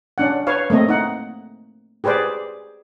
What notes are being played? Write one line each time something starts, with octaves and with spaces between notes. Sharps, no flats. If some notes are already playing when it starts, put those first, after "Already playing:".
C#4 D4 F#5
B4 C#5 F5
A3 A#3 C4 D#5
D#4 F#5
G4 G#4 B4 C5 D5